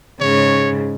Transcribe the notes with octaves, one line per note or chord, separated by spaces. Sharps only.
G#2 C#3 C#5